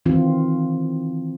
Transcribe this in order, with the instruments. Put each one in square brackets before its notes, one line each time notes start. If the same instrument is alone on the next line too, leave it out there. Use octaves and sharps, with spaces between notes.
[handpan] D#3 E3 C4 F4